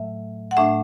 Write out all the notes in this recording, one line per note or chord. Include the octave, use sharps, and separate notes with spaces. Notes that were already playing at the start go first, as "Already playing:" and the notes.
Already playing: A2 F#3 A3 E5
F#5
A2 A3 D4 E5